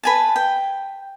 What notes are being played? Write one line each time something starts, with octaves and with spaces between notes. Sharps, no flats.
B4 G#5 A5
G5